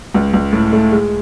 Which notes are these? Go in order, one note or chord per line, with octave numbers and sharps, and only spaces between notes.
C#2
C#2
A2
A3
G#3